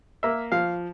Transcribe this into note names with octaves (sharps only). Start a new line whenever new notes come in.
A#3 E5
F3 F5